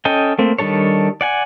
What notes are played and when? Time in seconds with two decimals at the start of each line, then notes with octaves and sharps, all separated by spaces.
0.05 C#4 A4 D#5 G5
0.39 A3 A#3 C4
0.59 D#3 G3 D4 A4 C#5
1.21 D5 F#5 G#5